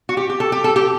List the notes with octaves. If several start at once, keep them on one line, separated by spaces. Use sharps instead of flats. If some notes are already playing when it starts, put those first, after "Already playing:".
F#4
G4
G4
A4
G4
A4
G4